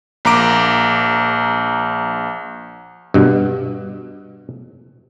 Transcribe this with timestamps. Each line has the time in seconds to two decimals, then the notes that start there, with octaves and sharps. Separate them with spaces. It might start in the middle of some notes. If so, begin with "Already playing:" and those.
0.25 A#1 A#3 A#5 D6 D7
3.14 G2 B2